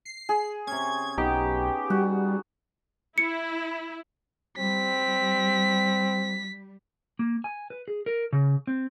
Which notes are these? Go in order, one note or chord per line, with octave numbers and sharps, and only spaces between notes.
C7
G#4
C3 C#4 G#6
B1 B3 D#4 G4
G3 F#4
E4 C#7
G3 C4 B6
A#3
G#5
B4
G#4
A#4
C#3
C4